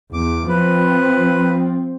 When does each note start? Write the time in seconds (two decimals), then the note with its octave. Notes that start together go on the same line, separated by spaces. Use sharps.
0.13 E2 D6
0.48 F3 C4 B4